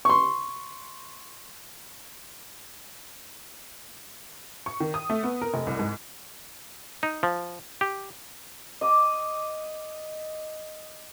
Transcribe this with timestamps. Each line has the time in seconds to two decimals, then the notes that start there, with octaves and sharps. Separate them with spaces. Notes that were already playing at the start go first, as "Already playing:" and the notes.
0.05 C6 C#6
4.66 C#6
4.80 D#3
4.94 D#6
5.10 A3
5.23 B3
5.42 A#4
5.54 F1
5.67 C2
5.79 G#2
7.03 D#4
7.23 F3
7.81 G4
8.81 D#5 D6